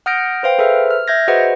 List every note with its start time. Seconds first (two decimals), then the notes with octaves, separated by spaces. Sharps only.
0.06 F#5 D#6 F6 G6 A#6 D7
0.43 B4 C5 F5 G5
0.58 G#4 A4 B4 C5 E5 F6
0.91 F6
1.08 E5 G6 G#6 A#6
1.28 F#4 G#4 B4 C5 D#5 F#5